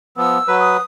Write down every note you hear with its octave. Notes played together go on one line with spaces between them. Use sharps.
F3 B3 E6
F#3 B4
D#6